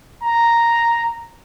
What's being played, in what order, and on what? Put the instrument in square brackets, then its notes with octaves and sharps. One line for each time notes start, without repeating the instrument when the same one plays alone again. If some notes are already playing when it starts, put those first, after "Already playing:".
[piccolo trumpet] A#5